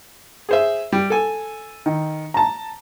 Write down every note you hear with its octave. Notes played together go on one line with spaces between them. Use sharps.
G#4 C5 E5
G3
A4 G#5
D#3
A5 A#5